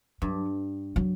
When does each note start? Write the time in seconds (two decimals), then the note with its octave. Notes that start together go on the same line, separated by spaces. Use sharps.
0.22 G2 F#3
0.96 F#3